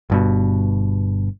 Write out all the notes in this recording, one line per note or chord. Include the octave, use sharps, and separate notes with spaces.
G1 G2 B2